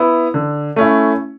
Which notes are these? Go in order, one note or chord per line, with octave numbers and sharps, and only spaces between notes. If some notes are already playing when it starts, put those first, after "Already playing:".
Already playing: B3 E4
D3
A3 C#4 E4